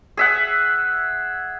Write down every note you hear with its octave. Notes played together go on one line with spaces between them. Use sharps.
G#4 E5 F#5